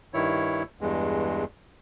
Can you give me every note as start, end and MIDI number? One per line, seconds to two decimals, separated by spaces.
0.14 0.63 43
0.14 0.63 51
0.14 0.63 64
0.14 0.63 73
0.81 1.44 40
0.81 1.44 43
0.81 1.44 56